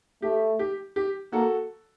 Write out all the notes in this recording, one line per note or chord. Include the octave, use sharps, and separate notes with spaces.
A3 G4
G4
G4
A#3 F#4 A4